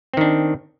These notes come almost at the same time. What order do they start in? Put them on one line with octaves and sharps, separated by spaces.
C4 D#3 D4